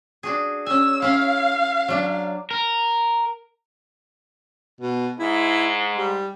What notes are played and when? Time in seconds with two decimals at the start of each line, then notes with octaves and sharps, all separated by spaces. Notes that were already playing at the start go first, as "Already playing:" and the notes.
0.23 D4 F#4 G#4
0.66 C#4 G#5 E6
1.02 C#4 E4 F5
1.88 F#3 D4
2.51 A#4
4.81 B2
5.19 G#2 E4
5.97 G3